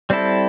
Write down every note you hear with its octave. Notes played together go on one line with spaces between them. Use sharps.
G3 C4 E4 A4